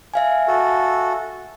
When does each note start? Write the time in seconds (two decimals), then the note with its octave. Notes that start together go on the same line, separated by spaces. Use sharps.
0.14 E5 F5 G#5
0.48 F#4 A4